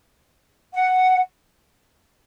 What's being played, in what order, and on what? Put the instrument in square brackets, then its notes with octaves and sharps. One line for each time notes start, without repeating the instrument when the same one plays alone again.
[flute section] F#5